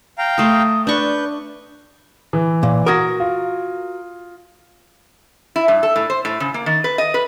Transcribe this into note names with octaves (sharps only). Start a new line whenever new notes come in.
F5 G5 A#5
A3 C6 D#6
D4 B4 D5 C#6 G6
E3
A#2
F#4 A#4 D#6 G#6 A#6
F4
E4
G2
A4
A2
C5
A2
C#3
A#3
D#3
B4
D#5
B4